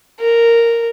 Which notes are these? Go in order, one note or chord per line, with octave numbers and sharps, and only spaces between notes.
A#4